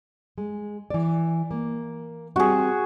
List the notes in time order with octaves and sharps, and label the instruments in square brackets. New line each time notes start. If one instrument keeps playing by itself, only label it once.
[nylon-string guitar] G#3
E3 D5
A#3
[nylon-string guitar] G3 C4 [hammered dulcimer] F#4 G#4